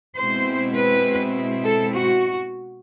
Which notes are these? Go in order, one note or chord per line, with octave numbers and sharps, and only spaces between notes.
B2 G#3 C4 E4 C5
B4
A4
F#4